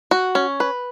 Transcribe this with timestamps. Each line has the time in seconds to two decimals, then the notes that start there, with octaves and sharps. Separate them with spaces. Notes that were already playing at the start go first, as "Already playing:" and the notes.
0.11 F#4
0.35 C#4
0.60 B4